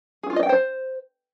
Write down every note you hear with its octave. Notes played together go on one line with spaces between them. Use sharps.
G#4
F4
D#5
G5
C5